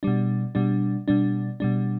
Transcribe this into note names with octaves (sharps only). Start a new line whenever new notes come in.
B2 G3 D4
B2 G3 D4
B2 G3 D4
B2 G3 D4